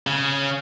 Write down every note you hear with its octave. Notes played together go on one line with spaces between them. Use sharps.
C#3